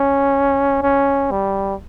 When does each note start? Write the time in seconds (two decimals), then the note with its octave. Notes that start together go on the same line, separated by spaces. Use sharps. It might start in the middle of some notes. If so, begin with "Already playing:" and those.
Already playing: C#4
0.83 C#4
1.31 G3